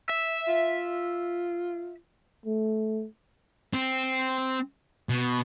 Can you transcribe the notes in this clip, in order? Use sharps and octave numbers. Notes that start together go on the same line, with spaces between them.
E5
F4
A3
C4
B2